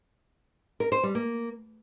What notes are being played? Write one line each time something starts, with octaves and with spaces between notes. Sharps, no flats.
A#4
C5
G3
A#3